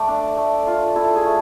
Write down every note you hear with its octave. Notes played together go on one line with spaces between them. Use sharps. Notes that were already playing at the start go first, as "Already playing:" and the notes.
Already playing: A3 D5
D4
A3
F4
E4 A4
G#4
A3